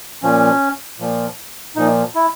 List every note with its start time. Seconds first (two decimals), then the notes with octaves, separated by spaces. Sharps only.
0.23 A#2 F3 C#4
0.99 A#2 F3
1.76 A#2 F3 D#4
2.15 E4